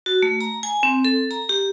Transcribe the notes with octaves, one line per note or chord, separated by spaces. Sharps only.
F#4
A3
A#5
G#5
C4
A4
A#5
G4